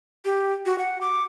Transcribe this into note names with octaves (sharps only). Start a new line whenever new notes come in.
G4
F#4
F#5
D6